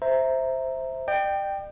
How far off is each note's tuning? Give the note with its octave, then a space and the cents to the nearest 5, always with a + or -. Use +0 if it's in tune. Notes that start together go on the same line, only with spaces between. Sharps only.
C5 +0 E5 +0 A#5 +0
D5 +45 G5 +0